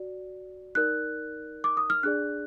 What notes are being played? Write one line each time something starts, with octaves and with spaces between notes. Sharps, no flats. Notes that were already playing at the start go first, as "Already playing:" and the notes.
Already playing: F#4 D5
D#4 A#4 D5 F#6
D6
D#6
F6
D4 G#4 D5 F#6